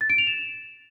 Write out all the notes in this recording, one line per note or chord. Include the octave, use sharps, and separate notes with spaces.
A6
D7
F7
E7